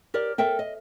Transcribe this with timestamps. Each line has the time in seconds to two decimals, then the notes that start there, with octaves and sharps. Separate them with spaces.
0.14 G4 A#4 D5
0.38 A4 A#4 E5 G5
0.59 D#5